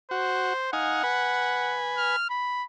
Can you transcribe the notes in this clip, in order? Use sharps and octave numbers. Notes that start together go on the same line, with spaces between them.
F#4 C5
D#4 F5 F#5 G#5
B4 G#5
F6
B5